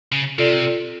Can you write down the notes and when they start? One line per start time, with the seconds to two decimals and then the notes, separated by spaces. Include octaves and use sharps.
0.12 C#3
0.38 C3 F4 A4 D5